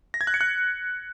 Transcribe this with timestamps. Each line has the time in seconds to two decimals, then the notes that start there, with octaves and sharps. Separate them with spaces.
0.14 A#6
0.21 G#6
0.27 F#6
0.34 C#7
0.41 F#6